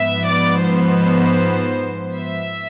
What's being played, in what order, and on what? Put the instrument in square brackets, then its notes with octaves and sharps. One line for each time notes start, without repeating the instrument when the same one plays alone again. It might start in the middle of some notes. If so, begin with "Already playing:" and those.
Already playing: [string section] G#2 F3 B3 E5
D5
C5
E5